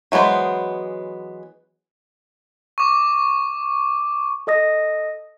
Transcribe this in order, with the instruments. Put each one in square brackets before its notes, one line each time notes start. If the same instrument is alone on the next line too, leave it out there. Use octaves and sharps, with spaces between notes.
[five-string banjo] E3 F#3 G#3 B3 C5
[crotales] C#6 D6
[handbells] A4 D#5 D#6 A#6